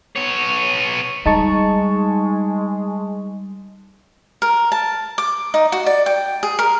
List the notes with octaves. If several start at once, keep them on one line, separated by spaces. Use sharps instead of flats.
B3 C#5
G3 G#3 D#4 A5 C#6
A#4
A5
D6
D#4
F#4
D5
G5
G#4
A#4